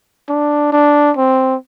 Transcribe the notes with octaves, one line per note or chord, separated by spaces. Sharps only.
D4
D4
C4